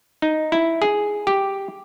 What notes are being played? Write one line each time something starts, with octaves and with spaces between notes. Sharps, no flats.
D#4
E4
G#4
G4